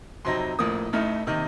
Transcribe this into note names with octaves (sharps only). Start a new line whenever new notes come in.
F2 C3 F#3 C4 D#4 C6
A1 A2 F3 A#3 D#6
A1 A2 A3 D#4 F6
C3 D#3 A#3 D#4